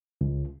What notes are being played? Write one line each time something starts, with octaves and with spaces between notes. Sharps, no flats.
C#2